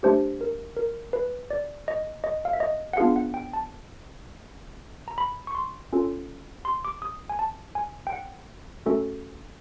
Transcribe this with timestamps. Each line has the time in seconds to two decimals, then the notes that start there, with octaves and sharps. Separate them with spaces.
0.03 A3 D4 G4 C5
0.41 A#4
0.77 A#4
1.13 B4
1.50 D5
1.88 D#5
2.24 D#5
2.45 F5
2.53 E5
2.60 D#5
2.93 F#5
2.97 B3 D4 F4 G#4 F5
3.16 F#5
3.34 G5
3.53 A5
5.08 A#5
5.18 B5
5.47 C#6
5.55 C6
5.93 C#4 F4 A4
6.65 C6
6.85 D6
7.02 D#6
7.30 G#5
7.39 A5
7.75 G#5
8.07 G5
8.13 F#5
8.86 A3 C#4 F#4 A4